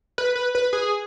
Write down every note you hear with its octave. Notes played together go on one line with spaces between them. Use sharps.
B4
B4
B4
G#4